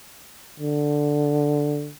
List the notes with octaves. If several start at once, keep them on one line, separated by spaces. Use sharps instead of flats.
D3